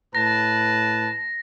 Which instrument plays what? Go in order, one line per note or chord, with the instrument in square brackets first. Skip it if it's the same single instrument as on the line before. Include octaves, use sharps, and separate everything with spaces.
[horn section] A2 B4 A5 [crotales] A#6